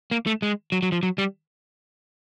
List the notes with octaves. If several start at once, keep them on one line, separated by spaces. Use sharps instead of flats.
A#3
A3
G#3
F#3
F#3
F3
F#3
G3